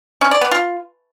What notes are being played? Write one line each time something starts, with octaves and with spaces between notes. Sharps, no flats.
C#4
D5
B3
F4